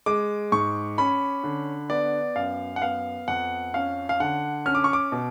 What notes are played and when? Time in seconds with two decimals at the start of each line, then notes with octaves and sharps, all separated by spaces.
0.06 G#3 D6
0.52 G#2 C#6
0.98 C#4 B5
1.44 D3
1.90 B3 D5
2.36 F#2 F5
2.76 F#5
2.82 B3 F5
3.28 F2 F#5
3.74 C#4 F5
4.09 F5
4.20 D3 F#5
4.66 C#4 F6
4.75 D6
4.84 C#6
4.93 D6
5.12 B2